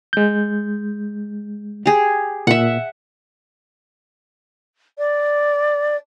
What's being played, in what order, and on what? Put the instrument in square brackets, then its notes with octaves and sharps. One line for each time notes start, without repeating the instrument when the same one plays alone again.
[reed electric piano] G#3 G6
[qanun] G4 G#4
[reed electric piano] A#2 [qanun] E5 F#5
[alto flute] D5